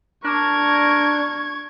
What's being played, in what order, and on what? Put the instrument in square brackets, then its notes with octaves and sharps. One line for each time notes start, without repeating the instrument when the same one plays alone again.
[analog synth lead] D4 [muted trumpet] A#4 [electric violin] C#6 G#6